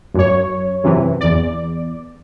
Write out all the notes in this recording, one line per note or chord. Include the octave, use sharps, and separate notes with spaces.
F#2 C#5
F#2 C3 E3
E2 D5